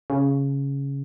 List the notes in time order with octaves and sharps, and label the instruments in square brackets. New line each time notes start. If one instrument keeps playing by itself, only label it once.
[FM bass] C#3